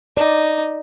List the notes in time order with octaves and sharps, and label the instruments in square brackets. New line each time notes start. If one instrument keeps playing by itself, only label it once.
[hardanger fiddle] D#4 [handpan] D5